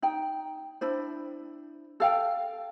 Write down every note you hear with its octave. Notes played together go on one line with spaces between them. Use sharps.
D#4 G5
D4 E4 C5
A4 F5 G5